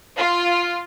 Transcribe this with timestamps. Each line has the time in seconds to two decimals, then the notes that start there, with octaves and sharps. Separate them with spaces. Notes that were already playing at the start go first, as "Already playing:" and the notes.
0.16 F4